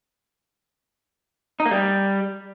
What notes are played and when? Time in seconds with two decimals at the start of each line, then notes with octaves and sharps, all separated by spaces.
1.60 D#4
1.66 A#3
1.71 G3